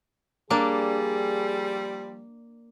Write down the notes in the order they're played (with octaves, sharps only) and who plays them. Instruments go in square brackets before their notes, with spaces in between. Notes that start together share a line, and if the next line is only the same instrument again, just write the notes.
[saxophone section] F3 G3 [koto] A#3 D4 [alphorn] G#4